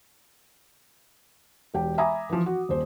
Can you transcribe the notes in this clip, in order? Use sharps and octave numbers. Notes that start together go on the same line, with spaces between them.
E1 G4 G5
E5 G#5 A#5 B5 D6 D#6
E3 F3
F#4
D#1 C5